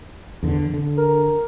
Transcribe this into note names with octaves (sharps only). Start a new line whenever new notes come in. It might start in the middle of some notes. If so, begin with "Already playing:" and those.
E2 D3
D3
A#4